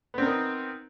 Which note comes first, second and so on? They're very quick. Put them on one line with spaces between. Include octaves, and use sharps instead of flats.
B3 C4 A#4 D#4